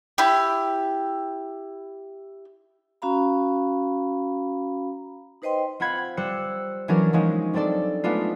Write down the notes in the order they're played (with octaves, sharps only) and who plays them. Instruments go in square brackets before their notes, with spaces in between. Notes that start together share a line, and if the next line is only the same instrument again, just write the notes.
[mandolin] E4 G4
[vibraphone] C#4 F#4 F5 A#5 B5
D#4 B4 C5 D#5 G5 C6
[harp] C4 F4 F#5 B5 G#6
G3 C5 E6 F#6 C#7
E3 F#3 C#4 D4 A#4
F3 F#3 G#3 C#4 D#4
G3 C4 D4 A4 D5
G#3 A3 B3 D4 D#4 F4